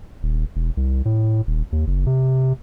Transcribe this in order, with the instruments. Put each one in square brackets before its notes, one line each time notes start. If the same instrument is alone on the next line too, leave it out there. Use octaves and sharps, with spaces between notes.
[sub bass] D#1
E1
C2
A2
D#1
D#2
F#1
C3